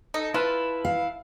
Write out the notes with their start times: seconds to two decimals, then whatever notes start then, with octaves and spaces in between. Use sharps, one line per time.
0.14 D#4 A4
0.34 E4 F4 B4 A5
0.85 F5